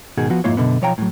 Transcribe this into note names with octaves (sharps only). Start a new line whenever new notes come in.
G#2 B2 D#3 F#4 G#4
F3 B3 F#4
F2 G#2 A#3 E4 F4 C#5
F#2 B2 D3 B3
B1 F3 C#5 F5 G5 A#5
A2 F#3